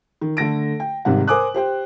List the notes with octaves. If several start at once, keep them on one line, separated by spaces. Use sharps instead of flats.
D#3
D3 A3 A#6 D7
G5
G#1 G#2 C3 G3 F#5
A#4 C5 G#5 D6 D#6 F#6
G4 C5 G5